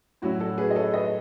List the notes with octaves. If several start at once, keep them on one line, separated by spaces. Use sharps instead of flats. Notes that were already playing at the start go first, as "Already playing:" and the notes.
A2 F#3 C#4 E4 F#4
F#4 A4
G#4 B4
D#5
A4 C#5
B4 D#5